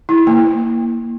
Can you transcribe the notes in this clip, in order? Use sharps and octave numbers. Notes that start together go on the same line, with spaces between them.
E4
A#3